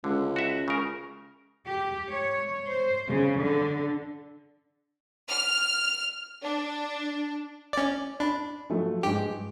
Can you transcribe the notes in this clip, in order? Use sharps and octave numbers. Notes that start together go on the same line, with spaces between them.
C#2 D3
F#4 E5
C#3 A#4
G4
C#5
C5
C#3
D3
F6
D4
C#4 D5
D4 B5
F3 F#3 A3
G2 G#3 G4